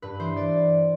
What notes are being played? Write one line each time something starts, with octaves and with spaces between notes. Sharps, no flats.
G2 B4
E3 C5
D5